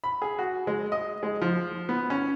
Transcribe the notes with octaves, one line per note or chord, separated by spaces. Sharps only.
B5
G#4
F#4
G#3
D#5
G#3
F3
B3
C#4